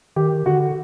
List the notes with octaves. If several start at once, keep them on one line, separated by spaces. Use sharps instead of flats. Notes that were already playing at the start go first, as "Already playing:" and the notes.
D#3 G4
D3 F#4